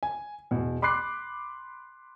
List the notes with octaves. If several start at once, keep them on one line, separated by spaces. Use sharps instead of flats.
G#5
E2 B2
B5 C6 D6 F#6 C7